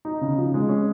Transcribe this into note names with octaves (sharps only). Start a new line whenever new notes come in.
D#4
C#3
F3
G#3
C#4